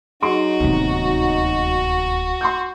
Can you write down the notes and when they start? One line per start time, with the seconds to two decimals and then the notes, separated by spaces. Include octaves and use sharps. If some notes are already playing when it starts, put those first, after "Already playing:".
0.22 F#3 D#4 F#4 G#4 C6 D7
0.60 D1 D#2 C3 D#3 B3
2.41 C6 C#6 G6